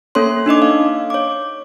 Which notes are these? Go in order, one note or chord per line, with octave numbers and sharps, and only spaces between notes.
A#3 C#4 A4 C#5 C6
D4 D#4 D#5 D6
F5
C#5 D6